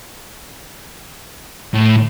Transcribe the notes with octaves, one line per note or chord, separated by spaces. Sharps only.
A2